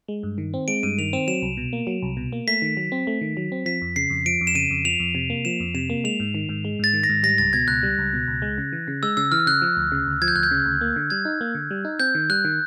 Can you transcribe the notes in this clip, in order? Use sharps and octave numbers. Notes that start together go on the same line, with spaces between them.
G#3
G2
D#3
C4
G#3 D7
G2 D#7
D#3 F7
C4 E7
F#3 E7
C2
B2
A#3
F#3
C2
B2
A#3
A3 B6
D#3
F#3
C4
A3
D#3
F#3
C4
F3 B6
F2
C#3 C7
F2
F3 D7
F2
E7
C#3 D#7
F2
F3 F7
F2
C3
A#3
F3 E7
F2
C3 E7
A#3
G#3 F7
G#2
D#3
G#2
G#3
G#2 A6
D#3
A#6
G#2
G3 A#6
C#2 A6
B2 G#6
C#2 F#6
G3
C#2
B2
C#2
G#3
C#3
E3
C#3
G#3 E6
C#3 E6
E3 F6
C#3 F#6
F3
D2
C#3
D2
F3 G#6
G6
D2 F#6
G6
C#3
D2
A#3
D3
G3 G#6
D#4
A#3
D3
G3
D#4
C4 G6
D#3
G3 F#6
D#3